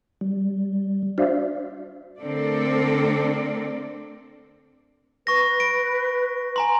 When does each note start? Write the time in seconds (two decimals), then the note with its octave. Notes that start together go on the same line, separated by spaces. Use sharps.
0.21 G3
1.18 D4 F#4 C5 D5 E5 F5
2.21 D3 A3 C4 A4 A#4 D5
5.27 B4 C#6 A#6
5.60 D7
6.56 G#5 A#5 C6